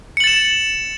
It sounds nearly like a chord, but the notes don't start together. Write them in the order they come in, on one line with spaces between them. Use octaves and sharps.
C#7 F#7 A6 E7